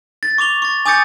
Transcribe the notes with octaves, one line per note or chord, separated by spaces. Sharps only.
A6
C#6 D6 F7 G7
C#6 A6
G#5 D6 D#6 G6 A6 C#7